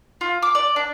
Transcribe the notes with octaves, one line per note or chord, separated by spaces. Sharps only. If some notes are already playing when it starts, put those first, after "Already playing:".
F4
D6
D5
D4